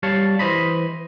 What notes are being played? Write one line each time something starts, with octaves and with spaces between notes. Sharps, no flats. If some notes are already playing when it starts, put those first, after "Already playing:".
G3 C#5 F5 A5
E3 C5 D#5 B5